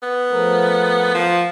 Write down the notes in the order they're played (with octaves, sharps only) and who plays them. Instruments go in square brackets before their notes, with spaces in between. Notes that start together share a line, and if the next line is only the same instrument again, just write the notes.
[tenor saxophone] B3
[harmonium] F3 A3 A#4
[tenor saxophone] F3